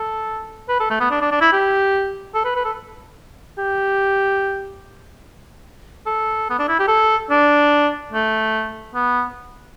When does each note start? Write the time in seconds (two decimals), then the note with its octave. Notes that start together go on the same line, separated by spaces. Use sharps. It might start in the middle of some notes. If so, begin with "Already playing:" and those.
Already playing: A4
0.69 B4
0.80 A4
0.90 A3
1.00 B3
1.11 D4
1.21 D4
1.32 D4
1.41 E4
1.53 G4
2.34 A4
2.44 B4
2.56 B4
2.65 A4
3.58 G4
6.06 A4
6.50 B3
6.59 D4
6.69 E4
6.79 G4
6.88 A4
7.30 D4
8.12 A3
8.94 B3